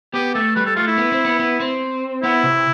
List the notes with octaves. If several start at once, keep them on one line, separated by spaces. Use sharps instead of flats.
B3 G4
A3 A4
G3 B4
A4
A3 F4
E4
B3
C4
B3
B3
C4
B3 E4
C3